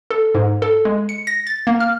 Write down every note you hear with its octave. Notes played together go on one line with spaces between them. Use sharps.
A4
G#2
A4
G#3
C#7
A#6
A6
A#3
F6